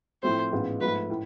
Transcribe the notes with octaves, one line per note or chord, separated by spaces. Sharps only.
A2 F3 A3 C4 C5
A1 G#2 G#3 B3 F4
G#2 F3 A3 B4
A2